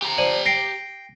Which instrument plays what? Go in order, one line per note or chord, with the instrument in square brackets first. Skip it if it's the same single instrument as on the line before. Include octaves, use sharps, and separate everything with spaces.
[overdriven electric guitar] G4 A#5
[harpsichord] F3 [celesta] D5 D#7 F#7
[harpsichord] G5 [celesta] A#6 C7 D7